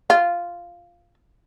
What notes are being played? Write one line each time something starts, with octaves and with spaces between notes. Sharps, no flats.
F4